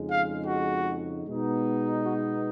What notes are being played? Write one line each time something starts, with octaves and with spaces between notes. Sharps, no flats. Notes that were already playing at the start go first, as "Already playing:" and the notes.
Already playing: F2 C#3 G#3 D#4
F5
F#4
B2 G#3 B3 D#4
F#4